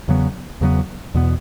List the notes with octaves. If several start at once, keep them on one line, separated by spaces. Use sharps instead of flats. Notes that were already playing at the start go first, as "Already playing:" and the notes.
E2 C#3 F#3 B3
E2 C#3 F#3 B3
E2 B2 B3